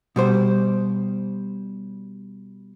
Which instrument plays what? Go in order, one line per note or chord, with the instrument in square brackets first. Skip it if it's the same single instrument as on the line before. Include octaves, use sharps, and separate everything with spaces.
[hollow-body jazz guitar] B2 G3 C5